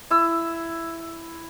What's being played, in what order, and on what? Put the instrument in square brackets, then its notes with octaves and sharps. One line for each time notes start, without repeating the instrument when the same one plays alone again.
[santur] E4 E6